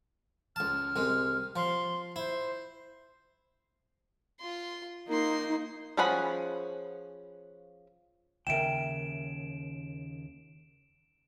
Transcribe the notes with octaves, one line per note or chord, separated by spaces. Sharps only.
C#2 A5 F6
C2 G#3
F3 C6
E4 C5
F4 C6
A#3 D#4 C6
F3 C#4 G#4 F#5 B5
D#2 C#3 A#4 E5 G5 D7 E7